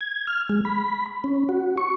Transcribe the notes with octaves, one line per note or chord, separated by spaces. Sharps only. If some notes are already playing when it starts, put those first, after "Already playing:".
G#6
F6
G#3
B5
C#4
F#4
C#6